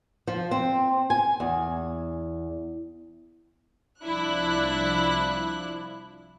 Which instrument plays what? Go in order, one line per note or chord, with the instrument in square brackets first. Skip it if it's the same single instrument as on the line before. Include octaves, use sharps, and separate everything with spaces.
[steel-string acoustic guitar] F3
C4
G#5
E2
[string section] C2 F3 D4 E4 F#6